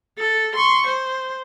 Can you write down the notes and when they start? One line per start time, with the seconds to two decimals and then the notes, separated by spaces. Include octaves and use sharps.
0.18 A4
0.55 C6 C#6
0.86 C5